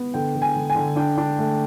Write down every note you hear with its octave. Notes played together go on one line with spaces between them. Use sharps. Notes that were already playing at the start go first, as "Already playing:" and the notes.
Already playing: B3
D3 G5
D3
G#5
D3
G#5
D3
D4 G5
D4
A3